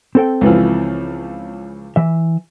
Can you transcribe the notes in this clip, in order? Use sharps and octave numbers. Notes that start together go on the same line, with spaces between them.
C4 A4 G5
C#2 E3 F3
E3 E5